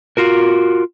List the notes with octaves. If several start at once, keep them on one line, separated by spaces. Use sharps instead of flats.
F4 F#4 A#4